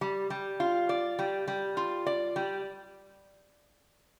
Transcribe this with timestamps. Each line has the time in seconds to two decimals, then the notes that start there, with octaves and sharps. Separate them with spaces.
0.01 G3
0.30 G3
0.60 F4
0.89 D5
1.19 G3
1.48 G3
1.77 F4
2.06 D5
2.36 G3